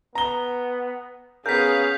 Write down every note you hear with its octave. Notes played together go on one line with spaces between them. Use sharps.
B3 A#5 G7
B3 C#4 G#4 A#4 F5 G6 B6